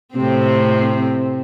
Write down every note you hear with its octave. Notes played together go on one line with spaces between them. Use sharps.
A2 C3 C4